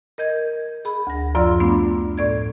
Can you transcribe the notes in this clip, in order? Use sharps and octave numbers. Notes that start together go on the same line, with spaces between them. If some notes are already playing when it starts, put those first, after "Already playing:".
A#4 D#5 G6 G#6
G#4 B5
D2 A#6
F#2 F3 F4 D5 C6 E6
A3 B3 D4
A2 D5 G#6